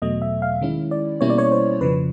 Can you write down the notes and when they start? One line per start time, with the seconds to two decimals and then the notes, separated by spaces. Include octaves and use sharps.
0.02 E2 B2 F#3 A3 D#5
0.22 E5
0.42 F5
0.61 D#3 G#3 C#4 E4
0.91 D5
1.21 B2 G3 A#3 C#4 E4 C#5
1.30 D5
1.38 C#5
1.52 C5
1.80 F2 C#3 F3 B4